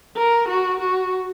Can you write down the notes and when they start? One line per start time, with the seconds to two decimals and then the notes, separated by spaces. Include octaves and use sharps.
0.17 A#4
0.48 F#4
0.80 F#4